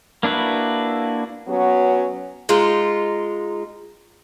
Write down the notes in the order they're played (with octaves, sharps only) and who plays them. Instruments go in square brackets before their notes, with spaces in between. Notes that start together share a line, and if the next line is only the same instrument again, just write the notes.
[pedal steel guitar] A#3 D4 E4 F#4 B4
[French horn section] F#3 B3 C#4 F#4
[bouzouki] G#3 D#4 F4